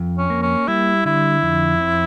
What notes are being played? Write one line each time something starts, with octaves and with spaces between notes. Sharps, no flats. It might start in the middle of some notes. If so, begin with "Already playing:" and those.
Already playing: F2
C#4
A#3
C#4
G3 E4
D3 E4
F2
C4